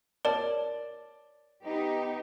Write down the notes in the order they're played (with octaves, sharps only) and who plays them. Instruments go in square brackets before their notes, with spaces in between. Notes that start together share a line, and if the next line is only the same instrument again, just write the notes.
[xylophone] A#4 C#5 A5 [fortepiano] D5
[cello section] B3 D#4 G4